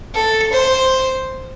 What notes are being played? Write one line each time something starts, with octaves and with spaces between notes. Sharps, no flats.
A4
C5